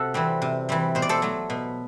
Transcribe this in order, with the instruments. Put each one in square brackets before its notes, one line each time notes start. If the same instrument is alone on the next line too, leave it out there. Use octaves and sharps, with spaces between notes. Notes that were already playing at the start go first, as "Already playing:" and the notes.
Already playing: [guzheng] C3 F#4 A4
E3 G3 C4
C3
E3 G3 C4
B2 C5
D5
A4 C5
F#3 A3
B2